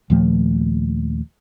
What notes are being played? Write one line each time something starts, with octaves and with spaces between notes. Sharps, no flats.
D#2 A#2 F3 A3